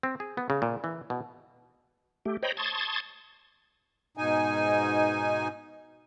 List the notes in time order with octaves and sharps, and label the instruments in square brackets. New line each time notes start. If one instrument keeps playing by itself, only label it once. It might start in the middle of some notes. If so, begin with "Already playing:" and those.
[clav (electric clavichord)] C4
G#4
B3
C#3
A#2
E3
B2
[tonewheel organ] A3 G4
C5 C#5 D#5 G5 A#5 B5
A5 C6 C#6 D#6 G#6 A6
[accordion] G#2 B2 D#4 G#5